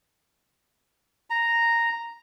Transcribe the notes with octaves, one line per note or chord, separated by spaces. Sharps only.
A#5